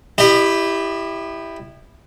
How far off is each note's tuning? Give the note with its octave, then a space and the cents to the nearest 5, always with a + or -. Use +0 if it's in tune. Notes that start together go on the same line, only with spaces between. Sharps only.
E4 +0 G4 +0 D#5 -40